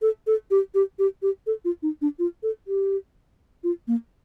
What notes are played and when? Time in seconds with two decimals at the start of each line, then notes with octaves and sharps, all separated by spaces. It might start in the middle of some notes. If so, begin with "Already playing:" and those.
0.02 A4
0.27 A4
0.51 G4
0.74 G4
0.99 G4
1.22 G4
1.47 A4
1.65 F4
1.83 D#4
2.02 D4
2.19 F4
2.43 A4
2.67 G4
3.64 F4
3.88 A#3